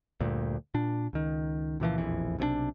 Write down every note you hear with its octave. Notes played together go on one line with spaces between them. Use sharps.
D2 G2 A#2
A#2 D4
C#2 D#3
C#2 A#2 E3 F3
E1 A#1 F2 E3
B1 C3 F3 D4